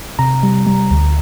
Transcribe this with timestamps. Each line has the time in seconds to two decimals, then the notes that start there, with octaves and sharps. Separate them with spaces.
0.19 C3 A#5
0.43 G3
0.66 G3
0.91 D2